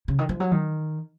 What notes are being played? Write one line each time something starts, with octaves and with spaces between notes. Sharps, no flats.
C#3
D#3
F3
F#3
D#3